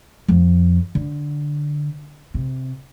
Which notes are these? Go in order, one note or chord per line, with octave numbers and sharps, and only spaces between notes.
F2
D3
C3